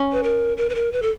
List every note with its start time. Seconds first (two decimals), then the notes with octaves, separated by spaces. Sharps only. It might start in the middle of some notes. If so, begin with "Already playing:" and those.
Already playing: C#4
0.12 B4
0.23 A#4
0.57 A#4
0.70 B4
0.75 A#4
0.92 B4
1.02 A4